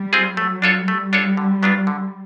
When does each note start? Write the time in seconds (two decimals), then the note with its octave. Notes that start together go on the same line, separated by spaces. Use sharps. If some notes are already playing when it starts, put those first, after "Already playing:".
Already playing: G3
0.13 C4 F4 G#4
0.37 F#3 A3
0.62 D4 F4 A4 C#5
0.87 G3 A3
1.13 D4 F4 A4 C#5
1.37 D3
1.63 F#3 B3 D4 F4
1.87 D3